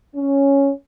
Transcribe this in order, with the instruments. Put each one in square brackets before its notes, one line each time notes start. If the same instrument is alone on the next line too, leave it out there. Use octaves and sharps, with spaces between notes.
[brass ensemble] C#4